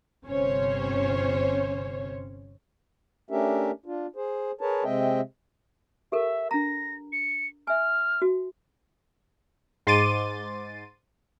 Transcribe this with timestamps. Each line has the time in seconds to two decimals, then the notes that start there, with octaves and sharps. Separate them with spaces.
0.25 G1 C3 C#4 C5 C#5
3.30 A3 C#4 D4 G4 A#4 E5
3.86 D4 F4
4.16 G#4 C5
4.61 G#4 A#4 B4 C#5 A5
4.84 C3 G#3 C4 D#5 E5 G5
6.12 G4 A4 A#4 E5
6.51 D4 A#5 A#6
7.12 C#7
7.67 E5 G#5 F6
8.22 F#4
9.87 G#2 C6 D6 A6 D#7